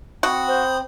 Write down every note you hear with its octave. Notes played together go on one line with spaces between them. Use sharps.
C4 F#4 B5 D#6
C5